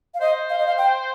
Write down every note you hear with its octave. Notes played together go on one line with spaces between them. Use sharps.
F5
C5 D#5
F5
D#5
F5
G5